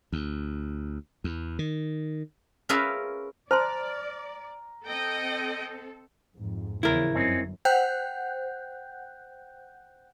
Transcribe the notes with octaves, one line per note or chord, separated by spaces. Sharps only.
D2
E2
D#3
C#4 F4 G#4 A#4 B4 E5
C5 D5 A5 A#5 C6 F6
C4 A4 D#5 G5
F2 G#2
E2 C#3 F3 E4 A#4
G1 F#2 C4 C#4 D#4
C5 F#5 G5 F#6 G6